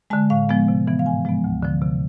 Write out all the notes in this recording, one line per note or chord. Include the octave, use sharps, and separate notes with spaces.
D3 G#3 A5
A2 F5
F3 G#3 B3
C3
E3 B3
F5
G#2 G#5
F3 G#3 B3
D2
D3 F3
C3